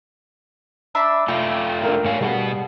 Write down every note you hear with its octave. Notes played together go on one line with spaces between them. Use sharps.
D4 E5 B5
A3 F4 G5
D4 A#4
G#2 C#5 F5
B2 G3 F#4 G#4 F#5